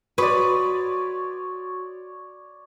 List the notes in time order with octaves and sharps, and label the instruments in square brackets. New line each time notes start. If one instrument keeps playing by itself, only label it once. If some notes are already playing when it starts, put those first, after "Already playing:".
[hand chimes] F#4 C6 D#6 [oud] B4 [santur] C#5 D5